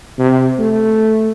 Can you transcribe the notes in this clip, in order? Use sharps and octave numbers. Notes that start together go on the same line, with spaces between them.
C3
A3